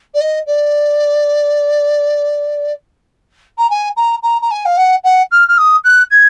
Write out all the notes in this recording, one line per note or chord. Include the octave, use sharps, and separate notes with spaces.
D5
D#5
D5
A#5
G#5
A#5
A#5
A#5
G#5
F5
F#5
F#5
F6
F6
D#6
F#6
G#6